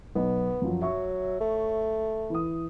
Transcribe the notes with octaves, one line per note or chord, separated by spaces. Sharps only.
B1 B3
F#2 F3 F#3
F#3 C#5 E5 C#6
A3
E3 D#6